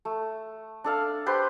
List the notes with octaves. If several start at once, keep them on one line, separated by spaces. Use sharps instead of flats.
A3
D4 A4 F5
G4 B4 C5 C6